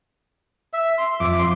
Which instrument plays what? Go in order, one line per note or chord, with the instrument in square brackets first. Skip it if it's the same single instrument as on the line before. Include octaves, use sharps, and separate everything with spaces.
[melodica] E5
C6
[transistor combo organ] F2 D6 [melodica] E5
[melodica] C6